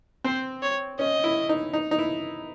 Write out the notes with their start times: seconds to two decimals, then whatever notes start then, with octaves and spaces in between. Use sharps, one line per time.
0.24 C4 C5
0.62 C#5
0.99 C#4 D#5
1.24 E4
1.49 D#4
1.73 D#4
1.91 D#4
1.99 E4